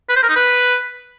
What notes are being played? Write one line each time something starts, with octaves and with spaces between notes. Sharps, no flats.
B4
C5
A#4
D#4
B4